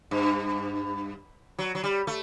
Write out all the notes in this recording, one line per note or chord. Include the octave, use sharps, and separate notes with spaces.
G2
F#3
F#3
G3
A3